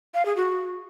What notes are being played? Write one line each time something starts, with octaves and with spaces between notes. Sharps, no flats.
F5
G#4
F#4